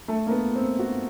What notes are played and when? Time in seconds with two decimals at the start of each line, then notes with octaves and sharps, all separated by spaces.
0.08 A3
0.27 A#3
0.31 B3
0.56 C4
0.79 F#4